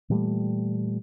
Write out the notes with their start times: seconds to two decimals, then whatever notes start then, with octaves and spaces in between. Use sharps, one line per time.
0.10 A#2 E3 G3 A3